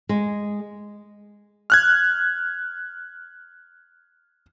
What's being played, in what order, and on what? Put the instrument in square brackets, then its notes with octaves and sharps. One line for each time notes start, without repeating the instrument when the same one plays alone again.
[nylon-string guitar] G#3
[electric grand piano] F6 F#6 G#6